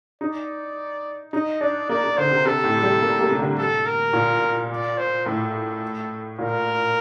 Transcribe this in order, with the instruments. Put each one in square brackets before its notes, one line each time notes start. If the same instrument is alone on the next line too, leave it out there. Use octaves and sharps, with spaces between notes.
[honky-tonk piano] D#4 [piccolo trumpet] D5
[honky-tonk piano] D#4 [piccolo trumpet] D#5
[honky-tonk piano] D4 [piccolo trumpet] D5
[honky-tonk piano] A#3 [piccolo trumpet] D5
[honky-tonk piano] A#3
[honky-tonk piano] D3 [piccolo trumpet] C5
[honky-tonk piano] C3
[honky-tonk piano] C3 [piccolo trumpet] A4
[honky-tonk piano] A2
G3
A#3
A#3
C3
D3
[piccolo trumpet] A4
A#4
[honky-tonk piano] A#2
[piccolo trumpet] D5
C5
[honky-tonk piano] A2 [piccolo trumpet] A4
[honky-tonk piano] A#2 [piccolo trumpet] A#4